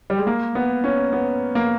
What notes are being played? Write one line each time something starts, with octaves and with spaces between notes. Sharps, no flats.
G3
G#3
A#3
B3
C#4
B3
A#3